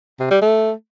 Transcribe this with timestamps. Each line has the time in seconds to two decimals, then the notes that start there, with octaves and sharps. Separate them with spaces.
0.20 C3
0.31 G3
0.42 A3